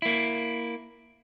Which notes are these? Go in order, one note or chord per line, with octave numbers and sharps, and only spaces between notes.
A#3 E4